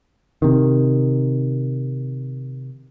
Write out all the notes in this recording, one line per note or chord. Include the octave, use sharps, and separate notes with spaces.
C3 D#3